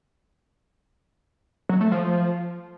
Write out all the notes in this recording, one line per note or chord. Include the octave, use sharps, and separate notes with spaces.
F#3
A3
F3